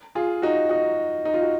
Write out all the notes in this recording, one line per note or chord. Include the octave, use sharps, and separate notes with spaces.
F4 G#4
D#4 F#4
D#4 F#4
D#4
F4
F#4